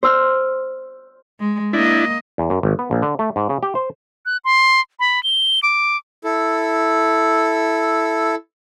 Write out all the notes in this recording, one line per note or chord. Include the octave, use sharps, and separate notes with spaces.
C5 E6 F6
G#3
A#3 D4 E4 D#5
E2
F#2
G#1
B3
A#1
D3
A3
G#2
C#3
G4
C5
F#6
C6
B5
G7
D6
E4 A4